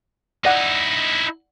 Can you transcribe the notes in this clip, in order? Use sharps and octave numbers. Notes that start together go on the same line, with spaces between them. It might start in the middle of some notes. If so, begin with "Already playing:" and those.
D#4 E4 D5 F#5